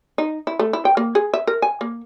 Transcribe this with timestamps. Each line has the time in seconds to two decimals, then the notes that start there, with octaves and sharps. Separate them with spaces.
0.18 D#4
0.47 E4
0.59 A3
0.73 E4
0.85 G5
0.97 A#3
1.15 G#4
1.34 E5
1.47 A#4
1.62 G#5
1.81 A#3